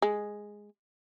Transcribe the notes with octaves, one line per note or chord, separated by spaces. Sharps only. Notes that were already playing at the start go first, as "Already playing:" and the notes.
G#3